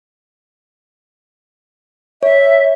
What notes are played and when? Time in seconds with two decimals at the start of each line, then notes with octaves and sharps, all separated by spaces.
2.23 C#5 E5